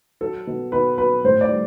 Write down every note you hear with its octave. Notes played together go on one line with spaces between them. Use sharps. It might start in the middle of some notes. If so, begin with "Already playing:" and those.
F#3 A4
B2
B2 B4
F#3 B4
A2 C5
D5
G3